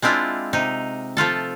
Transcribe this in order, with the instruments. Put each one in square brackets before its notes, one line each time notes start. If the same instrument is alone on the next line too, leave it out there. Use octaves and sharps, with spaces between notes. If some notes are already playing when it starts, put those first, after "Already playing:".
[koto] G#3 C4 D4 E4 F4
C3 D#4
F3 A3 F4 A4